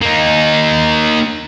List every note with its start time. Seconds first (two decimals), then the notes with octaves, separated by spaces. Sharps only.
0.02 A#3 D#4